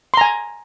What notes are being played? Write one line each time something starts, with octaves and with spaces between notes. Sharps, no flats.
G#5 A#5 C6